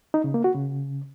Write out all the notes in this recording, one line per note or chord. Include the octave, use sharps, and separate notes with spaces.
D#4
C#3
A#3
F#4
C#3